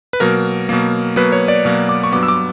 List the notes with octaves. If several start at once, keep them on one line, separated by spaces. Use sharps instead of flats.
B4
B2 F#3 A#3 A#4
B2 F#3 A#3
B2 F#3 A#3 B4
C#5
D5
B2 F#3 A#3
D6
C#6
G2 F#3 B3 D6
E6
D6